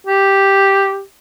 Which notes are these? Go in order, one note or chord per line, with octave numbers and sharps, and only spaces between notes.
G4